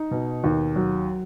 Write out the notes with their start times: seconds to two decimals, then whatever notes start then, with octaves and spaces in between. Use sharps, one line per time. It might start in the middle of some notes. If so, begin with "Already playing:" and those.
Already playing: D#4
0.11 B2
0.44 D#2
0.76 F#3